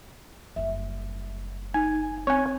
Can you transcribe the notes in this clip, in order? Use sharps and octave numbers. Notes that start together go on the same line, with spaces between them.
F#1 G3 E5
D#4 G#5
C4 C#5 G#5 F#6 G#6